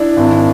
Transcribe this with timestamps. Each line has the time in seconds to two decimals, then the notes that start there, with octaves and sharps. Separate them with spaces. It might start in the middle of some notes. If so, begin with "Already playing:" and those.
Already playing: D4 E4
0.17 G#1